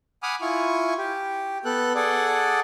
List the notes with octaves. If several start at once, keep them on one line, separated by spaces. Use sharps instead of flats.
F#5 G#5 B5 D6 D#6 F6
E4 F4 G#5 C#6
G4
B3 A4 F#6
G#4 A4 D5 F#5